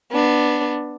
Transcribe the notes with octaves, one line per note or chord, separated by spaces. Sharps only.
B3 D4